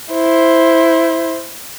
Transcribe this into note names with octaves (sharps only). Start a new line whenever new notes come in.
E4 C5